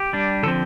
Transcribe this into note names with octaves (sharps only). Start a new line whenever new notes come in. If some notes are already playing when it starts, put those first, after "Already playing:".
Already playing: G4
G3 D4
D3 F3 C4 A4